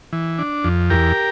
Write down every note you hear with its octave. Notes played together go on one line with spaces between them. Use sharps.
E3
D4
F2
E2 G4 A#4